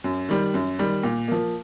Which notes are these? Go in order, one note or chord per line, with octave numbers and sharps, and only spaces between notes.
F#2
D#3 G3
F#2
D#3 G3
A#2
F3 A#3